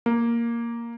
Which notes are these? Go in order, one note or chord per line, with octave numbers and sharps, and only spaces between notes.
A#3